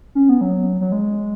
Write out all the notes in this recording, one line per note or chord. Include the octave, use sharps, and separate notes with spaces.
C#4
B3
F#3
F#3
G#3